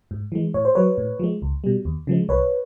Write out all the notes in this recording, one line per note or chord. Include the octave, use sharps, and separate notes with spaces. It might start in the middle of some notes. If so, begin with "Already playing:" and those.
G#2
E3 G#3
A2 C#5
C5
F#3 B4 C#5
A2
F3 G#3
C#2
B2 G3
D#2
C#3 F3 G#3
C2 B4 C#5